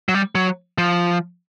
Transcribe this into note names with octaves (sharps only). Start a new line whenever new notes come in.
F#3
G3
F#3
F3